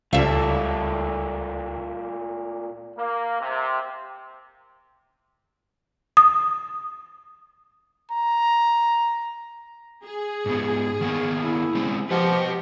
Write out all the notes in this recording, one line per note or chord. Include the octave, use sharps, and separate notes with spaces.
C#2 A#2 G3 A3 A4 E5 F5
A#3
C3
D#6
A#5
G#4
G#2 B3
D#3 A#3 B3
E4
G#3 C4 C#4
F3 G4 B4 D#5 F#5